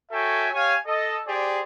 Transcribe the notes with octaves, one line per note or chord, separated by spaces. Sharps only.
F#4 A4 C#5 E5 G5 G#5
G4 C#5 F5 G#5
A4 D#5
G4 G#4 C5 D5